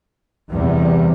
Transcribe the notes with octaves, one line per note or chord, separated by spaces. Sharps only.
E2 C3 G3